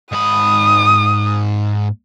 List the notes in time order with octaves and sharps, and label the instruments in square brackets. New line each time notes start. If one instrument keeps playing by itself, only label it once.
[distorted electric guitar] G#2 B5 [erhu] D#6